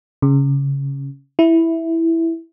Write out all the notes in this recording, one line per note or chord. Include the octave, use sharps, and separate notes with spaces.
C#3
E4